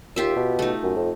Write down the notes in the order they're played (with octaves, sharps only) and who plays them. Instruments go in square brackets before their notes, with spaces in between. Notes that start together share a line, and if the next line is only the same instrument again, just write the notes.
[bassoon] D#2 [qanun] F4 G4 E5
[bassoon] B2
[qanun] A3 D#4
[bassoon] F#2
F2